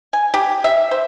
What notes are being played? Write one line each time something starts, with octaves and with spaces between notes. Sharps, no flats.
G#5
G4
E5
C5